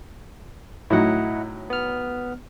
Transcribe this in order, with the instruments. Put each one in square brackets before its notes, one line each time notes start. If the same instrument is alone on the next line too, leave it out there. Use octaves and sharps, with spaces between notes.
[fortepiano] A2 F#3 D#4 [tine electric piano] E4 D#5 F#5
[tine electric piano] B3 F6